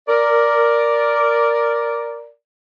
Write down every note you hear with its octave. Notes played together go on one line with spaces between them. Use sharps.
A#4 D5